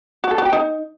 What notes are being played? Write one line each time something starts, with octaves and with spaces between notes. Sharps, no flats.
F#4
A4
F#4
G5
D#4